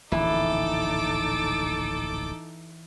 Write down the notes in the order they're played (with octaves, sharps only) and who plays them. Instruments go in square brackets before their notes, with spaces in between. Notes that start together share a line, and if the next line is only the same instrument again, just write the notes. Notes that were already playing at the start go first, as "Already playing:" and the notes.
[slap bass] D1 A#1 C#3 [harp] E3 [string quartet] D#4 A4 D6